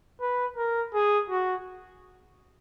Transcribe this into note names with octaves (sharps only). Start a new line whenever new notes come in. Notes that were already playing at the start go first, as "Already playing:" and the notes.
B4
A#4
G#4
F#4